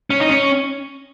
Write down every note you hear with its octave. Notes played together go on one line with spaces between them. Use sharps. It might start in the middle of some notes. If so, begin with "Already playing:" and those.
C#4
D#4
C#4